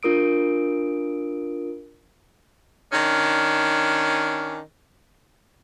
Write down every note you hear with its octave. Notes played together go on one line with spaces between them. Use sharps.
D4 F4 A#4 D#6 D7
D#3 C#4 D4